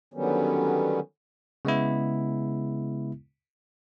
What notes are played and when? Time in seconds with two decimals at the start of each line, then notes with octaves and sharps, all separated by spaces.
0.14 D3 D#3 F#3 G3 B3 C#4
1.65 C#3 G#3 B3 E4